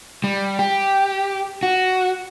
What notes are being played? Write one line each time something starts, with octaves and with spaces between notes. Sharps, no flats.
G3
G4
F#4